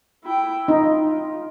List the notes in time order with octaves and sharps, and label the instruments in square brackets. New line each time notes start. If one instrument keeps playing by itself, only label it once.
[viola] E4 G5
[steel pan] D#4 [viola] F4